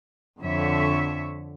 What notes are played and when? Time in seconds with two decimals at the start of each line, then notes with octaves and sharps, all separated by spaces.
0.42 F2 D3 C#5 E5